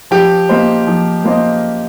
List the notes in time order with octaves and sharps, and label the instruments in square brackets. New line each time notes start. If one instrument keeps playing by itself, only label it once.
[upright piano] F3 [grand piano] G4
[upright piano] A#3 F4 C5 D#5
F3
A#3 F4 C5 D#5